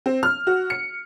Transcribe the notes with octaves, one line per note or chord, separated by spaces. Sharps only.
C4
F6
F#4
C#7